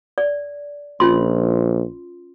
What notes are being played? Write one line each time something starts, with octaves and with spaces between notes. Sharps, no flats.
D5
A#1 C#4 F4 C6